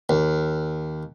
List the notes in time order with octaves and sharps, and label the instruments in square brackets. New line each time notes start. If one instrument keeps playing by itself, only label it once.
[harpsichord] D#2